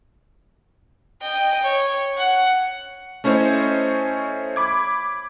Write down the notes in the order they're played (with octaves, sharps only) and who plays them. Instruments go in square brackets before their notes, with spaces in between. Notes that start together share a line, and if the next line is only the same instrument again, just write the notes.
[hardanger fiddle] D#5 G5
C#5
F#5
[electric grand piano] A3 C#4 E4 C5 C#5 D#5
B5 D6 G#6